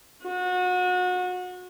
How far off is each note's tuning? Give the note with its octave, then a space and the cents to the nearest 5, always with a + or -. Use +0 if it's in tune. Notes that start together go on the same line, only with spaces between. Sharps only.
F#4 -30